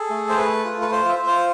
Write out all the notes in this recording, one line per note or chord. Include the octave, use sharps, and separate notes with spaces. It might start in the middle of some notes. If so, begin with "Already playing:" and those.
Already playing: G#4 A4
A3
C5
A3 B4
F4
B4
F4 C5
E5
F4
C5